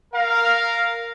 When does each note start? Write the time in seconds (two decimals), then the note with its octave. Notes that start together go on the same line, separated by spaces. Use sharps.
0.13 A#4 F5